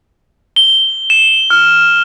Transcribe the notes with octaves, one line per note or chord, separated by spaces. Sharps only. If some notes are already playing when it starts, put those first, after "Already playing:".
G7
E7
F6